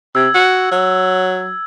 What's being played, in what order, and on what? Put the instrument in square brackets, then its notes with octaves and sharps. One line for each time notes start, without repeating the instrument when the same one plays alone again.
[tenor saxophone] C3 [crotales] E6 G#6
[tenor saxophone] F#4
F#3